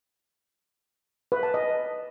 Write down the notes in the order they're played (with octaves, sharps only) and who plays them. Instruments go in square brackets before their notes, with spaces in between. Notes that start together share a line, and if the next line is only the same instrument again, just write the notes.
[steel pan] B4
A5
D#5